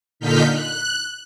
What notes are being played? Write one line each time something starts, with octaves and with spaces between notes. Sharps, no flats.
A#2 D3 D#4 F6 G6 B6
F#6